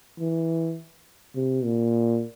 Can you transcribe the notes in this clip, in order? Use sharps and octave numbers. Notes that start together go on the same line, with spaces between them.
E3
C3
A#2